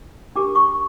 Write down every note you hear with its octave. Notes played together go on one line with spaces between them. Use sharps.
D4 G4 A#4 D6
C#6